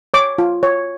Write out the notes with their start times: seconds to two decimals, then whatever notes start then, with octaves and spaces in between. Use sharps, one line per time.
0.14 C#5 D6
0.38 F4
0.63 C#5